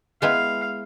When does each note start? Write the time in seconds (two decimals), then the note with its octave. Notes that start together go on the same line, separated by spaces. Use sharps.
0.22 G#3 B3 E4 F5